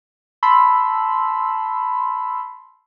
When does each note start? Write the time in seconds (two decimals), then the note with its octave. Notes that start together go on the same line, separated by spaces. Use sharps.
0.43 A5 B5 C6 E6